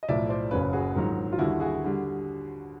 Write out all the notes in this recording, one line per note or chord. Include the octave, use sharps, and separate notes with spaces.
D#5
B1 A2 F3 D5 E5
C5 D5
F#1 F#2 C#3 B4 C#5
F#4 G#4
A#1 G#2 D#3 F#3
F4
D#2 D3 G3 E4 F#4
F#4 G#4
D3 G3